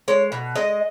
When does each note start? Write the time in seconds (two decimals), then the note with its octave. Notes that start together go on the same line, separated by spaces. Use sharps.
0.08 G#3 C#5
0.32 B2
0.55 G#3 D#5